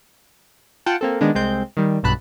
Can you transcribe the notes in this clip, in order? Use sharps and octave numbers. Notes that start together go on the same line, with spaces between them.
F4 F#5 G5 A5
A#3 C4 A4
D#3 G#3 B3 D4
C2 G#3 C4 G6
D#3 G3
B1 G2 B2 A5 B5 F#6